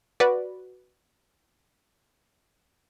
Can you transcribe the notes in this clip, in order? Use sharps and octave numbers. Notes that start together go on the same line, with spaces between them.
F#4 B4 D5